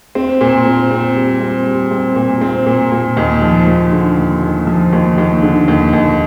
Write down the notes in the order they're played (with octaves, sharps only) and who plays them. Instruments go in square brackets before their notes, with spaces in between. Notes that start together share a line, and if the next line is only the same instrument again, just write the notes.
[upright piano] C4
A#2
C4
C4
G3
C4
G3
C4
A#2
C4
A#2
A#2
D#2
F3
D#2
D3
D#2
D#2
F3
D#2
D#2
D3
D#2
D#2